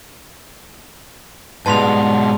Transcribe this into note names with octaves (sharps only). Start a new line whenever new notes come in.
G#2 B2 G3 G#3 B4 A5 C6 F7